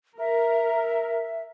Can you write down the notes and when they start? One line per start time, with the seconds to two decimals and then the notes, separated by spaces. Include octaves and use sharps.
0.19 A#4 E5